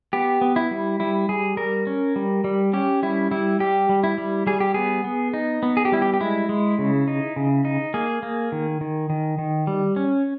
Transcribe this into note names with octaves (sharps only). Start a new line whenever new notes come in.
B3 G4
B3
E4
G3
G3 E4
G3 G#4
G3 A#4
C#4
G3
G3
C#4 G4
G3 E4
G3 E4
G3 G4
G3
E4
G3
G3 G#4
G4
B3 G#4
B3
D#4
B3
G#4
G4
G3 E4
G4
G4
G#3 E4
G#3
C#3
D#4
C#3
D#4
A#3 G#4
A#3
D#3
D#3
D#3
D#3
G3
C#4